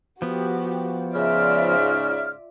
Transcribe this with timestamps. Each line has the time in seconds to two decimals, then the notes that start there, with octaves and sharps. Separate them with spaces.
0.22 F3 B3 F#4 G4
1.15 G#2 C#3 F4 D5 E5 F6